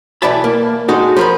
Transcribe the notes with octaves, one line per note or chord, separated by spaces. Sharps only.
B1 E3 D5 E5 A5 B5
A#3
G#3 D#4 F#4 A4
F3 G3 A#4 C5 B5